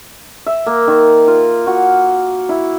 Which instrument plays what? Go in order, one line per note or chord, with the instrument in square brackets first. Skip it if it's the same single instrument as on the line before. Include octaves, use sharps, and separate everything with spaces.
[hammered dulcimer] E5
A#3
D#3
F4
F#4
E4